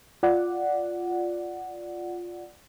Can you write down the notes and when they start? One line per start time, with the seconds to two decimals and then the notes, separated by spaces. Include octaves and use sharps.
0.23 F4 D5 F#5